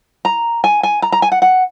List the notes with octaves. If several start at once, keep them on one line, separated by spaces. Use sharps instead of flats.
A#5
G#5
G#5
A#5
A#5
G#5
F#5
F#5